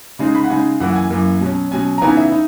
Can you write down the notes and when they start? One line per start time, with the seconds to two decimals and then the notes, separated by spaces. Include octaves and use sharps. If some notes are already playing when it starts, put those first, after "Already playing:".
0.19 C#3 G#3 D#4
0.35 B5
0.44 F#5
0.50 C#3 G#3 D#4 G#5
0.80 F#2 E3 A#3 F#5
0.90 F#5
0.95 G#5
1.10 F#2 E3 A#3
1.41 B2 F#3 C#4
1.71 B2 F#3 C#4 G#5
1.98 A#5
2.01 C#3 E3 B3 D#4 G#5
2.17 E5
2.32 D#4